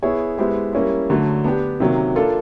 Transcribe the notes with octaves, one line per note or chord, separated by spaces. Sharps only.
B3 E4 G#4 C#5
G#3 B3 E4 G4 C5
G3 A#3 C#4 E4
D3 F#3 A3
B3 D4 G4
C3 D#3 F#3 A#3
A#3 D4 F4 A4